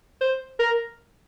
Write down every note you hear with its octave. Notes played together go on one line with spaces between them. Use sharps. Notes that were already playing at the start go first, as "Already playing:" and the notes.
C5
A#4